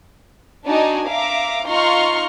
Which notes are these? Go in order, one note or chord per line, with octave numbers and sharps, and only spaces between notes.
D4 D#4 F#4 G#5
E5 F5 A#5 D6
D#4 F4 A#5 C6 C#6 F6